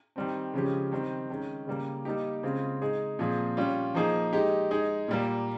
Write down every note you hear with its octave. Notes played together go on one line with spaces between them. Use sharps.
D#3 G3 C4
C#3 F3 G#3 C#4 G4
D#3 G3 C4
D#3 G#3 C#4
C#3 G3 A#3
G3 A#3 D#4 G4
C#3 G#3 C4 F4 G#4
G#3 D#4 G#4
A#2 F3 C4 F4 G#4
G3 C#4 F4
F3 A#3 D#4 G#4
G#3 D#4 G4
G#3 D#4 G#4
A#2 G3 A#3